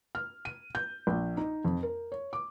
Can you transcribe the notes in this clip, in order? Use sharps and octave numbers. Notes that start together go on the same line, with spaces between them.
F6
D#7
G6
A#1
D#4
F2
A#4
C#5
D6